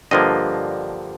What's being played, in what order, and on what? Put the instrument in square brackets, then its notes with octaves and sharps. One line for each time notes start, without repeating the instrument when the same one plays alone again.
[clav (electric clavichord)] G2 D3 F3 A#3 D#5